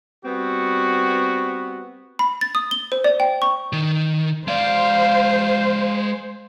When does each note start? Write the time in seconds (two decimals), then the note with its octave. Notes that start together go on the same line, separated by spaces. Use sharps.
0.24 G3 B3 C4 F#4
2.19 B5
2.41 A6
2.55 D#6
2.71 G7
2.92 C5
3.04 D5
3.20 G5
3.42 C#6
3.73 D#3
4.48 G#3 C5 D5 F5